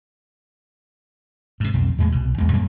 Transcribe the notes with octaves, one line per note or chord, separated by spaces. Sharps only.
G#2 C3
B1 F2
E2 A2 G#3
C2 B2
A1 E2 G#3
F#2 A#2 G3 A#3